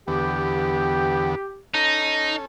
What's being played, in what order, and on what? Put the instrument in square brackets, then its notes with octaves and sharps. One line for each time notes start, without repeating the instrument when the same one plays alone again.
[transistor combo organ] E2 D3 B3 [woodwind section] G4
[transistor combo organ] C#4 A4 [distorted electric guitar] D#4